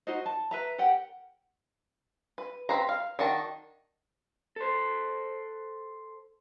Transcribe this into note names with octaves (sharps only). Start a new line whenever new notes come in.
D#4 F#4 C5 D#5
A5
B4 E5 A#5
G4 A#4 F#5 G5
B4
C4 B4 C5 A#5
F5
D#3 D4 F#4 A5
A4 C5